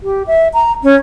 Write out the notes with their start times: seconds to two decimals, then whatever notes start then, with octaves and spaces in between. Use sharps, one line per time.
0.03 G4
0.27 E5
0.54 A#5
0.84 C#4